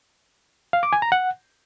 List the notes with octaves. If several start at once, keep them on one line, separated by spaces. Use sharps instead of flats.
F5
D6
G#5
A#5
F#5